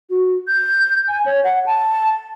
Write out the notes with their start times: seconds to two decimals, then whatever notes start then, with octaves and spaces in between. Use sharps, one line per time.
0.10 F#4
0.48 G6
1.08 G#5
1.26 C#5
1.44 F#5
1.66 A5